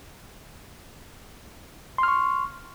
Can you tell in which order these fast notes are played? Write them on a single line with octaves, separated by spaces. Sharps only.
C6 F6 C#6